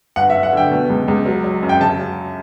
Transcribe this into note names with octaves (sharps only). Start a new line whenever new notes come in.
G1 F#5
E5
G1
F#5
D3 G5
B2
C#2
C#2
F#3
F#3
F#2
G5
C#3 A5
F#3